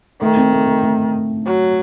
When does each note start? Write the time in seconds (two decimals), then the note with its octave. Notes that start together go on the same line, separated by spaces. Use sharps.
0.22 D#3 A3
0.37 C4
0.53 A3
0.67 A3
0.83 A3
1.46 F#3